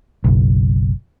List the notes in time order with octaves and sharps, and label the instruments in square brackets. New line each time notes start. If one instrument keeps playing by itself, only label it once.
[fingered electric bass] F#1 B1